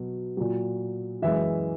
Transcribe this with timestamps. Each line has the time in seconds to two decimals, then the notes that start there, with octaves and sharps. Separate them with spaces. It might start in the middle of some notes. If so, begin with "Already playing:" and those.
Already playing: B2 F#3
0.37 A#2 F#3
1.22 F#2 E3 G#3 E5